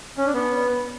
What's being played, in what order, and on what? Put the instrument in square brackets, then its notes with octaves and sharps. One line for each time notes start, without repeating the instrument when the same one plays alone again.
[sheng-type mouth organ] C#4
D4
B3